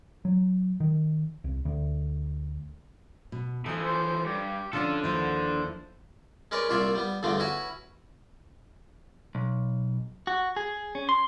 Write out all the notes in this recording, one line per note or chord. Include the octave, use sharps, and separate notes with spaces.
F#3
D#3
C2
D2
B2
E3 F3 C#4 D#4 A4
C5
G2 G4
D3 F3 C#4 D4 F4 A4
D#2 F3 E4 C5
G#3 C#4 A#4 B4 C#5 D5
C2 A#2 F4 C#5 D5 E5
G3 B3
E2 G2 D3 F3 A3
C#4 E4 F#4 B4 B5
B1
F#4
G#4
C#4
C6